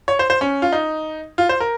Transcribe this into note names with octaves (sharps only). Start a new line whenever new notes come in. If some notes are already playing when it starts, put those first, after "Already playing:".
C#5
C5
C5
C#4
F4
D#4
F4
C5
A#4